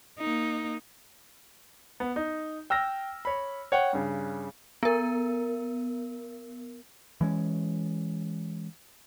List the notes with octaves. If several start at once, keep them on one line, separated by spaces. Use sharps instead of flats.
A#3 D#4
B3
D#4
G5 E6 F6 A#6
C#5 B5
C#5 F#5 G5
G2 C#3
B3 A#4
E3 G#3 C#4